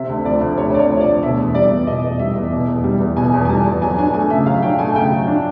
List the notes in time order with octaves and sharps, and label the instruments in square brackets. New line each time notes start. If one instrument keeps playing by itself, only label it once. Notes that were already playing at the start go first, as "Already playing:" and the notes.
Already playing: [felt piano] C3 [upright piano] E5
[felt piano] D2
[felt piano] F3 [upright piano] D5
[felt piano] D2
[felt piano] C3 [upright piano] C#5
[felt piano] D2 [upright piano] D5
[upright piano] C#5
[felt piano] F3
[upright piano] D5
[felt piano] D2
[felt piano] B2 [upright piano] E5
[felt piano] E2
[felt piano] G3 [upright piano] D5
[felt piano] E2
[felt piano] B2 [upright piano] D#5
[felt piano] E2
[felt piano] G3 [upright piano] E5
[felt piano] E2
B2
E2
G3
E2
[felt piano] B2 [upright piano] G#5
[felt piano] E2
[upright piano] G#5
[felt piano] G3 [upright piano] A5
[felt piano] E2
[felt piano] F#3 [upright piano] G#5
[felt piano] D4 [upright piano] G#5
[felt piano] A3 [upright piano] G#5
[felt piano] C#3 [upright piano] E5
[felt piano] F#3 [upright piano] F5
[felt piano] D4 [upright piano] G5
[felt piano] A3 [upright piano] G#5
[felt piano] C#3 [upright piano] G5
[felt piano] F#3
D4